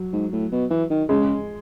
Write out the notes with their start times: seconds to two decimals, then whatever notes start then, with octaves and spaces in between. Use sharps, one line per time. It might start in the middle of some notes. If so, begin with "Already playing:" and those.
Already playing: F#3
0.13 G#2
0.33 A2
0.52 B2
0.70 E3
0.90 D#3
1.09 C#3 G#3